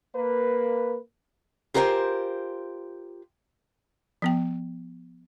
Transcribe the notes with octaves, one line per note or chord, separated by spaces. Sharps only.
A#3 B4
F4 G4 A#4 C5 F#5 G#5
F3 B3 G5